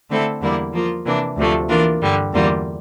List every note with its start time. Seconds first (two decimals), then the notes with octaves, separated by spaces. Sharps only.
0.10 D3 A3 C4 E4 A4
0.41 E2 D3 G3 A#3 E4
0.73 F3 A#3 F4
1.05 C3 E3 A#3 D4
1.37 D2 C3 F3 A3
1.69 E3 A#3 D4 F4 A#4
2.01 G2 D3 G3
2.33 E2 D3 G3 A#3 F4